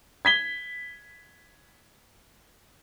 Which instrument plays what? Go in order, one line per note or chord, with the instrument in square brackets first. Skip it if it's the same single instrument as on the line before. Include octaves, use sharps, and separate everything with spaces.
[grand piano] G#6 B6 G7